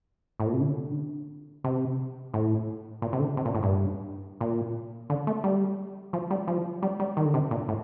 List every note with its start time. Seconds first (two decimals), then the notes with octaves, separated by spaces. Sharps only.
0.40 A2
0.47 A#2
0.53 C3
0.60 D3
1.64 C3
2.34 A2
3.02 A#2
3.13 C3
3.20 D3
3.37 C3
3.45 A#2
3.55 A2
3.63 G2
4.41 A#2
5.10 D3
5.27 A3
5.44 G3
6.13 F3
6.30 G3
6.47 F3
6.82 G3
7.00 G3
7.17 D#3
7.25 D3
7.34 C3
7.51 A#2
7.68 A2